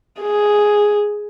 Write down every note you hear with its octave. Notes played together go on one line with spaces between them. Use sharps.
G#4